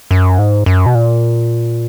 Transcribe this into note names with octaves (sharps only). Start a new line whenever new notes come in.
F#2
G#2
F#2
B2
A#2